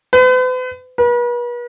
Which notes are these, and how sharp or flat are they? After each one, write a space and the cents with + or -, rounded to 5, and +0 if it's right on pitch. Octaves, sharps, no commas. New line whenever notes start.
B4 +45
B4 -40